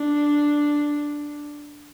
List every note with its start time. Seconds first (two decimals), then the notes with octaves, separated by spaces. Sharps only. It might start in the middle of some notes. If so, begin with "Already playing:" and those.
Already playing: D4